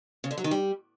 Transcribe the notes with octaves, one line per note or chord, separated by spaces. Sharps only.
C#3
D3
F#3
D#3
G3